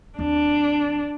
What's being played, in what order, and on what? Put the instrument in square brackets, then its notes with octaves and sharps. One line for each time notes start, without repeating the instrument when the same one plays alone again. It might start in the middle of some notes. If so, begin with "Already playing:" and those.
[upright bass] D#2 C4 [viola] D4